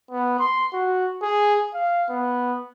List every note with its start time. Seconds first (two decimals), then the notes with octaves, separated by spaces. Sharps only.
0.11 B3
0.39 C6
0.73 F#4
1.22 G#4
1.74 F5
2.10 B3